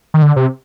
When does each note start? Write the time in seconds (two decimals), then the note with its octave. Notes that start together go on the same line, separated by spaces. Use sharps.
0.14 D#3
0.22 D3
0.36 C3